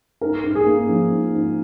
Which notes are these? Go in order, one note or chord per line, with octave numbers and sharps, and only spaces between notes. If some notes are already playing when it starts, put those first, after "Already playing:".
G#2 A#4
G#2
G#4
A#3
F3
G#2
G#2